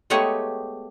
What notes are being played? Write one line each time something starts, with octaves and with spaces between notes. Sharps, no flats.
G#3 A3 B3 G4 C#5 D#5